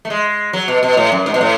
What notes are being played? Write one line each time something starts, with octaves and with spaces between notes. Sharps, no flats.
A3
G#3
F#3
B2
B2
A2
F#2
G#2
B2
A2